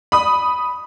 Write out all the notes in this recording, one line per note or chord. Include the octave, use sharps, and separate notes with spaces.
B5 D#6